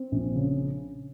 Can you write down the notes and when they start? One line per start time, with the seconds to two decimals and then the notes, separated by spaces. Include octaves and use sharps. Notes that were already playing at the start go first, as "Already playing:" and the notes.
Already playing: C4
0.12 A#1
0.36 C#3